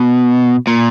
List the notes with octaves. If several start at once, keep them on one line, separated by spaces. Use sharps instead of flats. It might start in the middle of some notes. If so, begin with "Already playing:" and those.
Already playing: B2
A#2